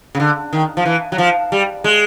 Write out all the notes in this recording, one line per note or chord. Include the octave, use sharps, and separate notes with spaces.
C#3
D3
D#3
F3
E3
F#3
F3
G3
G#3